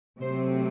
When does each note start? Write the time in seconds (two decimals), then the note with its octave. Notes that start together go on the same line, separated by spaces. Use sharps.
0.19 C3 F#3 A3 C4 C5